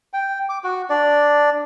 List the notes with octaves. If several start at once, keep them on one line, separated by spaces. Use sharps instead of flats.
G5
D6
F#4
D4 D5